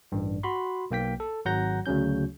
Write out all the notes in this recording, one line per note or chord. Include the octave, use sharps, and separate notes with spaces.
A1 G2
F#4 B5 C6
B1 A#3 G5 B6
A4
G#1 F#3 F#5 A#5 G6 A#6
D2 C#3 F#3 C#4 G6